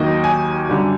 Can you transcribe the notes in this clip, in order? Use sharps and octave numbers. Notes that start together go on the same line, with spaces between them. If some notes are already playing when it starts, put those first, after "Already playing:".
Already playing: D#2 D#3 F#3 A#3 D#4 D#5
G#5
F#2 D3 G3